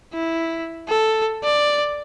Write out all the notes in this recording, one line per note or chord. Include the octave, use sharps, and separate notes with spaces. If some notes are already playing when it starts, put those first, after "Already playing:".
E4
A4
D5